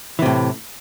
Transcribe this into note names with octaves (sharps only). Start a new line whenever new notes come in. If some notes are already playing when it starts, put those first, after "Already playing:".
A2 C3 E3